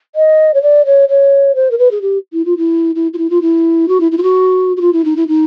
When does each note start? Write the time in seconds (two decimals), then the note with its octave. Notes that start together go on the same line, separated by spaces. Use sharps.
0.15 D#5
0.54 C#5
0.62 D5
0.86 C#5
1.09 C#5
1.55 C5
1.71 A#4
1.78 B4
1.91 G#4
2.02 G4
2.33 E4
2.45 F4
2.57 E4
2.95 E4
3.13 F4
3.18 E4
3.30 F4
3.42 E4
3.88 F#4
4.00 E4
4.12 E4
4.18 F4
4.23 F#4
4.77 F#4
4.81 F4
4.93 E4
5.05 D#4
5.17 E4
5.28 D#4